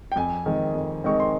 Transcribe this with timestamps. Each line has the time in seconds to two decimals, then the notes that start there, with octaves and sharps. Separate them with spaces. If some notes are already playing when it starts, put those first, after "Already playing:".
0.12 G5
0.16 F2 G#5
0.46 D#3 G#3 C4
0.75 F2
1.04 D#3 G#3 C4 C#6
1.20 C6